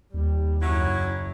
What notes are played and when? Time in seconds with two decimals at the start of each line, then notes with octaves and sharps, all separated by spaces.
0.14 D#2 G3
0.62 F#1 F#3 C#4 E4